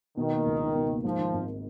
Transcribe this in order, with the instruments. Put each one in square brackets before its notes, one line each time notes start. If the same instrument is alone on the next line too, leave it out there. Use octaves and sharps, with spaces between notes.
[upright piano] B2 [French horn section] D#3
[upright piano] A#3
C#2
D#4
B2
A#3
[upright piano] G#2 [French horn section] F3
[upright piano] D#3
G#1